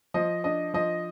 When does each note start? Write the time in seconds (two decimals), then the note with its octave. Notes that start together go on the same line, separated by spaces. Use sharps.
0.14 F3 D#5
0.44 D4 D#5
0.74 F3 D#5